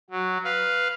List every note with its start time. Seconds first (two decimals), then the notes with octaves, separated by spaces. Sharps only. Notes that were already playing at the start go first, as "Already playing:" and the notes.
0.10 F#3
0.44 B4 F5